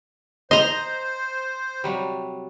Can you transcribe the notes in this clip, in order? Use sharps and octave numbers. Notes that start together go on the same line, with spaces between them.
C5 D#5 A#5 C6
C3 F#3 G3